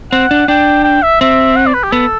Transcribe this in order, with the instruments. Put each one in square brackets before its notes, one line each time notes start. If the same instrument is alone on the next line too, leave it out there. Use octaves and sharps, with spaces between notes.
[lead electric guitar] C4 [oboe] F#5
[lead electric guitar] D4
[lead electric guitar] D4 [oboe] G5
[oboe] G5
E5
[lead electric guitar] C4 [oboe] E5
[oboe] F#5
D5
B4
G4
[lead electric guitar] B3 [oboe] A4